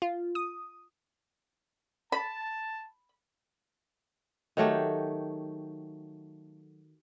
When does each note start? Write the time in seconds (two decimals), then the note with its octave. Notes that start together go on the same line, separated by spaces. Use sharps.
0.02 F4
0.35 D#6
2.12 A5 B5
4.57 D#3 F#3 A3 G4